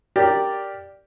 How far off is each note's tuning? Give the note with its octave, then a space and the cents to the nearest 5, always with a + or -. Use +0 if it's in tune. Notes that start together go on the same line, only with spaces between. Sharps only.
G4 +0 A#4 +0 D5 +0